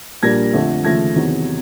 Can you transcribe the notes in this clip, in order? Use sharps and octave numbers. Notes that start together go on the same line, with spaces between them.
A#1 A#2 G3 A#3 D4 G#6 A#6
F2 D3 F3 A3
D#2 C#3 F3 A3 G#6 A#6
E2 C3 D#3 F#3